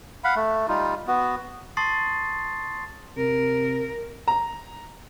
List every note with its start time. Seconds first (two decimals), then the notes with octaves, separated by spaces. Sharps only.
0.24 F5 F#5 B5
0.36 A3
0.68 G3 D#4 F4
1.07 B3 F#4
1.77 A5 C6 C#6 D#6 A6 C7
3.17 C3 A#4
4.28 A#5